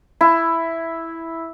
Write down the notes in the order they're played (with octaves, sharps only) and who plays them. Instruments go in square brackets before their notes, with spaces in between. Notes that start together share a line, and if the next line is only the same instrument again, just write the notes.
[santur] E4